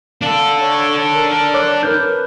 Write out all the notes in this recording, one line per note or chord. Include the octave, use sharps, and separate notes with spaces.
D4 A4 F5
C#5
A#4
C#5 D6 F#6
A#4 B4 F6 G6